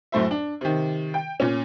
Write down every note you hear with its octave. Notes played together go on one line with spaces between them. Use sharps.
F#2 A2 A3 C5 E5
D4
C3 D#3
G5
A#2 C#4